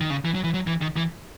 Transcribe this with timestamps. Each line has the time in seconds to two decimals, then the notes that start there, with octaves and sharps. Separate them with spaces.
0.01 D#3
0.10 C#3
0.25 E3
0.35 F#3
0.44 E3
0.54 F#3
0.67 E3
0.82 D#3
0.97 E3